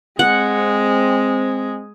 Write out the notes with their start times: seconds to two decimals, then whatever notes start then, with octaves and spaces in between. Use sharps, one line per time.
0.19 G#3 C4 F#5